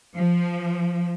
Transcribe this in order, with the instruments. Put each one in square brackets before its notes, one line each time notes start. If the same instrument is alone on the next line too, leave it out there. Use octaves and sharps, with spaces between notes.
[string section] F3